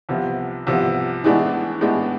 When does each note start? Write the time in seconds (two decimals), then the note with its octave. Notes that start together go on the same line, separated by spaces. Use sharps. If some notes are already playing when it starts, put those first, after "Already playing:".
0.09 C2 C3 F3 B3
0.67 C2 C3 F3 B3
1.24 A2 E3 G#3 B3 D4
1.81 A2 E3 G#3 B3 D4